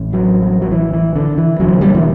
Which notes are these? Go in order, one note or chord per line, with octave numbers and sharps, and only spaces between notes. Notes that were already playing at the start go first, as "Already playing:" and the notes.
Already playing: A1 A2
F#3
F#3
F#3
E3
E3
D3
E3
E1 E2 D3 F#3
G3
E3